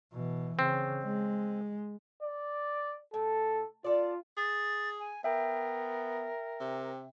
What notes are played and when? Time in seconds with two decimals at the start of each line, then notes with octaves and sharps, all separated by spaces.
0.13 B2 E3
0.59 C#3 C4
1.05 G#3
2.22 D5
3.14 A2 A4
3.84 F4 A4 D5
4.37 G#4 A6
4.99 G#5
5.24 B3 A#4 E5 G5
6.60 C3